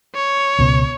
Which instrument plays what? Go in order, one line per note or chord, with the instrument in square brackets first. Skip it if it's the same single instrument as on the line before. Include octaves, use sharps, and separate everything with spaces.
[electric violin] C#5
[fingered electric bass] C#2 B2